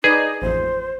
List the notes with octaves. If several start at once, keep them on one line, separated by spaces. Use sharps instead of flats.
D#4 G#4 B4 D5 D#5
A1 F2 C5